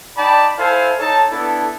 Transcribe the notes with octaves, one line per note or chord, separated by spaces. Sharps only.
D#4 D5 G5 A5 B5
E4 A4 C5 F5 G#5 A5
D#4 A4 C#5 A5
B3 D4 E4 A4